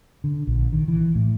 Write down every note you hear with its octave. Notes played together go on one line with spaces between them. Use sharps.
D3
A#1
D#3
E3
A2